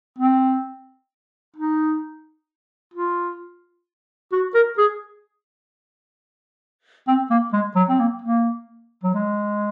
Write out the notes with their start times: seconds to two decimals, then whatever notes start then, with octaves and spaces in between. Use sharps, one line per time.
0.19 C4
1.57 D#4
2.94 F4
4.32 F#4
4.54 A#4
4.78 G#4
7.08 C4
7.30 A#3
7.53 G#3
7.76 F#3
7.89 C4
8.00 A#3
8.22 A#3
9.04 F#3
9.14 G#3